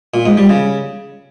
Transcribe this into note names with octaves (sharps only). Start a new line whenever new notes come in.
A#2
G#2
G3
C#3